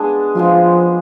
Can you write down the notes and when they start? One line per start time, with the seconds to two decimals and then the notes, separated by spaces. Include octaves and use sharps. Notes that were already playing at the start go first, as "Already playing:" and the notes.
Already playing: G#3 B3 D4 G#4
0.35 F3 G#3 B3 D4 F4